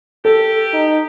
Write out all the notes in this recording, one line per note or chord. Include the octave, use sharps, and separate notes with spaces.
G4 A4
D#4